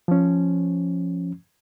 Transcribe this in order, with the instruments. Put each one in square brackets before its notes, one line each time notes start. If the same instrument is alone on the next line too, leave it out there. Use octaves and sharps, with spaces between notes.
[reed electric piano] F3 C#4